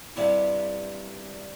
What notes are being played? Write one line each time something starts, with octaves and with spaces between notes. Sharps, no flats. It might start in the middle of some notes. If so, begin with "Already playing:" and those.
G2 C3 G3 E4